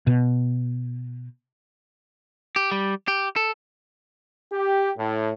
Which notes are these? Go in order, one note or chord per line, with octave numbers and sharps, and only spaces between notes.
B2
G4
G3
G4
A4
G4
A2